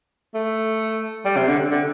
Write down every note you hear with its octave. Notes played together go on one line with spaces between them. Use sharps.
A3
G3
C3
D3
D3